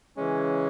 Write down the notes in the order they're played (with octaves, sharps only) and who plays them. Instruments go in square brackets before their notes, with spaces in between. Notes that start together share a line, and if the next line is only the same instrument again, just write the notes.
[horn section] C#3 E3 G#3 C#4